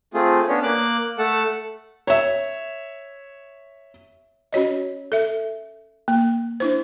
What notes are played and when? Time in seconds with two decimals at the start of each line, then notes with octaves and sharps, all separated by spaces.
0.14 A3 C4 F4 G#4
0.48 B3 C#4 D4 C#5
0.63 A#3 D6 F#6
1.18 A3 A4 F#5 A5
2.07 C#5 E5
4.53 C#4 F#4 C#5 D#5
5.12 A4 E5
6.08 A#3
6.60 D4 E4 C5